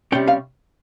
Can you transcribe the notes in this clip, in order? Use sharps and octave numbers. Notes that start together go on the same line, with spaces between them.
C3 G3 C#4 G5
F5